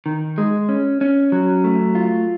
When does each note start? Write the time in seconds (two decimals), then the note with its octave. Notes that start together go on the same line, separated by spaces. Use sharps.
0.06 D#3
0.38 G#3
0.69 C#4
1.01 C#4
1.32 F#3
1.64 A3
1.95 F4